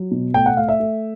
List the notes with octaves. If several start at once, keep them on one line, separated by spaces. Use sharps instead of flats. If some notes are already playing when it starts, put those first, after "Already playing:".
Already playing: F#3
B2
A3 G5
F#5
A3 F5
E5
A3